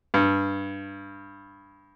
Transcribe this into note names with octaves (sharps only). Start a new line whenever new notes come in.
G2